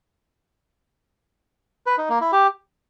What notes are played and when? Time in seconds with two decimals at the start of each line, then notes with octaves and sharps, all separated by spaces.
1.86 B4
1.98 D#4
2.09 A#3
2.21 E4
2.32 G4